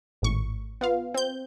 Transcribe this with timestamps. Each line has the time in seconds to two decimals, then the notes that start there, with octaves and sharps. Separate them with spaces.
0.22 G#1 A2 C#6
0.81 B3 F4 F5
1.14 C4 G6